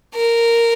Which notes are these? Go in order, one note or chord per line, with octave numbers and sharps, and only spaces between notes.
A#4